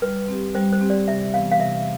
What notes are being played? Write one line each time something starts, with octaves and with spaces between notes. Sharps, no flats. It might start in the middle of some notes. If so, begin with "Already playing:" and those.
G3 B4
C4 G4
G3 C5
C5
C4 G4
D5
C3 E5
E3 B3 F5
F5
C3 E5